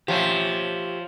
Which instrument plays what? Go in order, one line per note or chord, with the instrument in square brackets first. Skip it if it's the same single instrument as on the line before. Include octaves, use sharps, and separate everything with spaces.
[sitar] F3 [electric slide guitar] G4 C#5 E5